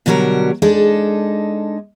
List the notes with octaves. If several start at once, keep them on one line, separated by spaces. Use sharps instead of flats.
B2 D3 F#3 G3 A#4
G#3 D4 D#4 A4